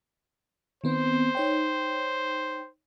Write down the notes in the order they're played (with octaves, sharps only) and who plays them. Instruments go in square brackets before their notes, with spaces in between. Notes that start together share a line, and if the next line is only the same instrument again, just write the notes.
[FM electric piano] D#3 B3 C4 [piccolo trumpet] C5
[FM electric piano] D#4 C#5 G5